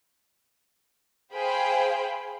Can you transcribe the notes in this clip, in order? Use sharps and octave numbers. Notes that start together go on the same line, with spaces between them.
G#4 C5 F5 G5 B5